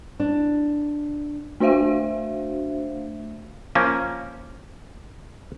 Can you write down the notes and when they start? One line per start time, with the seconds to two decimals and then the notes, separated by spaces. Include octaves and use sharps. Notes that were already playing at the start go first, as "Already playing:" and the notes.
0.20 D4
1.60 A3 D4 F#4 C5 E5 F5
3.75 F3 A#3 C#4